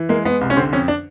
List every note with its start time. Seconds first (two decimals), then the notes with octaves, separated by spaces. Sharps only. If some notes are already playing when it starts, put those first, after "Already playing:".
Already playing: E3
0.09 G#3 A#3
0.25 G#3 B3
0.41 C2
0.50 C#4
0.57 D3 C4
0.73 F2 C#4
0.88 D4